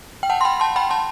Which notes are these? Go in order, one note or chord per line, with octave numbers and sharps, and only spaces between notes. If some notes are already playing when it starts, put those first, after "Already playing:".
G5
F#5 A5
C6
G5 B5
A5 C6
G5 B5
A5 C6